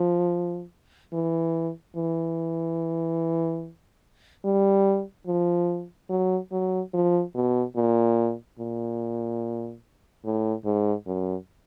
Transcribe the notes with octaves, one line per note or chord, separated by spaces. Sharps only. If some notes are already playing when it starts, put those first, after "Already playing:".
Already playing: F3
E3
E3
G3
F3
F#3
F#3
F3
B2
A#2
A#2
A2
G#2
F#2